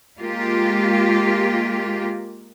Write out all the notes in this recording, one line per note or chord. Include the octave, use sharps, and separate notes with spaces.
G#3 A#3 F4 G4